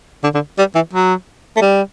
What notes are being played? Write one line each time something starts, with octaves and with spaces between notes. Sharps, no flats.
D3
D3
G3
E3
F#3
A3
G3